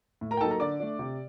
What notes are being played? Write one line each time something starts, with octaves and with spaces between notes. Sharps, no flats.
A2
A#4 A#5
G5
F#3 A#3 D#4 A4 A5
A#4 A#5
D3 D5 D6
A3 D4
C3